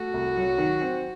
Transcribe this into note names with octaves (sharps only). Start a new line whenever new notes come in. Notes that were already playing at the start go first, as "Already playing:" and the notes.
Already playing: A3 F#4
C2
F#3
D#3
C4